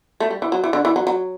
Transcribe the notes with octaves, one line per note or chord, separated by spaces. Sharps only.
A3
G3
E3
F#3
E3
D3
E3
F#3
F#3